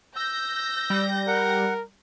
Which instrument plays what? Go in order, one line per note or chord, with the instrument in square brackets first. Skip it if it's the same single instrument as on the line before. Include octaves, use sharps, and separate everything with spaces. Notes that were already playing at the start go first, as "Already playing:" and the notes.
[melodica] E6 [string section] G6 A#6
[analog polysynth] G3
[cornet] A#4 [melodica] F#5